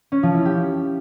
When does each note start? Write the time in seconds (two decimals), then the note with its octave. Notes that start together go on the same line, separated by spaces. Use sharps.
0.12 C#4
0.23 F3
0.34 E4
0.45 G4